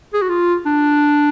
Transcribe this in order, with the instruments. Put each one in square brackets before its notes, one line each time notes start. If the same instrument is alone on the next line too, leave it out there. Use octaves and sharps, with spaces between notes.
[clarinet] G#4
F#4
F4
D4